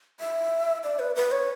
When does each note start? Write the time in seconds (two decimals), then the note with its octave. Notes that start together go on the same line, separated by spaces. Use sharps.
0.20 E5
0.84 D5
0.99 B4
1.16 B4
1.32 C#5